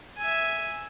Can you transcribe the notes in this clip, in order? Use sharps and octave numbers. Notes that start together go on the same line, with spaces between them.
E5 G#5